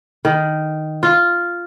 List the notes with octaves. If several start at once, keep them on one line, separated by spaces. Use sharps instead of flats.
D#3
F4